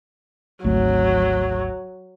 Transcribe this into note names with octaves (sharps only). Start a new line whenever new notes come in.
G#1 D2 F#3 A3